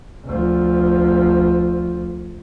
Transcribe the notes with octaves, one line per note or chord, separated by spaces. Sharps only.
D2 F3